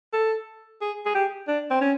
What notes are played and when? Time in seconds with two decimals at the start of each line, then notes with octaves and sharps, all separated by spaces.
0.13 A4
0.81 G#4
1.05 G#4
1.15 G4
1.48 D4
1.71 C4
1.81 C#4